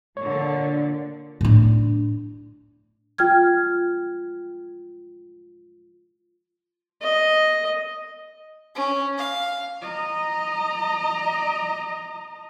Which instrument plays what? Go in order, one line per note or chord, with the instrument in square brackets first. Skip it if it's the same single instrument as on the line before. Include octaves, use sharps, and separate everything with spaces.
[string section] A#2 D3 [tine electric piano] C#5
[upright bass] A2 D4
[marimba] F4 G5 F6 G#6
[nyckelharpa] D#5
[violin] C#4
F5
[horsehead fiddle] D#5 A#5